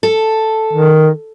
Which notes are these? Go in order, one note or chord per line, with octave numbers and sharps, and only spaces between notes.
A4
D#3